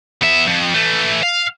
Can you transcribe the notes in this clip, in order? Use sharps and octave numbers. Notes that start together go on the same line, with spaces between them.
B3 E5
F2
E3 A3
F5